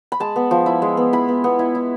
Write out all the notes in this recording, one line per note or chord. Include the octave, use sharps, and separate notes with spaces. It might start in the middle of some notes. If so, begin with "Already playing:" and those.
B5
G#3 A5
B3
F3
E4
G#3
B3
E4 B5
B3
B3
E4
E4